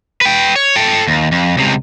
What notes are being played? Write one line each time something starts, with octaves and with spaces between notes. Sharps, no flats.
B4 G5
C#5
A4 G5
D#2
F2
C#2 C3